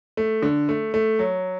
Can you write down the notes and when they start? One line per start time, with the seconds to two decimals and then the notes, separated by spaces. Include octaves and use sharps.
0.17 A3
0.42 D3
0.69 A3
0.94 A3
1.19 F#3